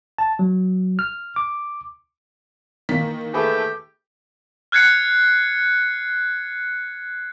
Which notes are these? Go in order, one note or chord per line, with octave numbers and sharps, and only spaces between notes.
A5
F#3
F6
D6
D#3 E3 A#3 B6
A3 G4 G#4 B4 B5
F6 F#6 G#6 C7 C#7